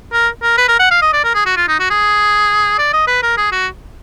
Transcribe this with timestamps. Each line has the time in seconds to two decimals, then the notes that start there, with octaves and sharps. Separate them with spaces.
0.13 A#4
0.43 A#4
0.57 B4
0.68 A#4
0.79 F#5
0.90 F5
1.02 D#5
1.13 D5
1.24 A#4
1.34 G#4
1.46 F#4
1.57 F4
1.68 D#4
1.79 F#4
1.90 G#4
2.78 D5
2.93 D#5
3.07 B4
3.22 A#4
3.37 G#4
3.52 F#4